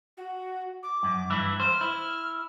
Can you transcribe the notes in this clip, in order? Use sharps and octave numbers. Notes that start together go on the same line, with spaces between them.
F#4
D6
F#2
G2 E3 E4
C5 F6
E4